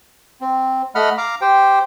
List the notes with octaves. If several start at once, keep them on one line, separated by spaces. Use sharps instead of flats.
C4
A3 D#5 F#5 B5 F6
F5 A#5 D6
G4 C5 G5